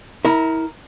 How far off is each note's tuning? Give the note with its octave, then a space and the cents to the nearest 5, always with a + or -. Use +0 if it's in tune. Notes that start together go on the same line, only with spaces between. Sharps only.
E4 -30 A#4 +0